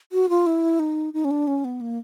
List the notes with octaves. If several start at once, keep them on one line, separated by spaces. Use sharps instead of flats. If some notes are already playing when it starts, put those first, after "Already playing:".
F#4
F4
E4
D#4
D#4
C#4
D4
C#4
B3
A#3